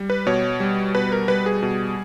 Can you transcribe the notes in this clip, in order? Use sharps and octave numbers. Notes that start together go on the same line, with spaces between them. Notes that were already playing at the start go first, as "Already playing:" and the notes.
Already playing: G3
B4
B2 C#5
G3
B2 B4
A#4
G3 B4
G#4
B2